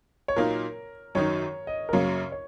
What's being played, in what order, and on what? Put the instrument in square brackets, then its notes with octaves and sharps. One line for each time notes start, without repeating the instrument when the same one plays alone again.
[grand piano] C#5
[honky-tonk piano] A#2 F#3 A#3 D#4 [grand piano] A#4
[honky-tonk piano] F#2 D#3 F#3 D#4 [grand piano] C#5
[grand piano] D#5
A#4
[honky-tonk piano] F#2 C#3 F#3 A#3 [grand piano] C#5
[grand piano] C#5